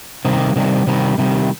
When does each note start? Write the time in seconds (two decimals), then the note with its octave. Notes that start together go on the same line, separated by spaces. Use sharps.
0.25 C3 D#3 G3
0.56 C3 D#3 G3
0.87 C3 D#3 G3
1.18 C3 D#3 G3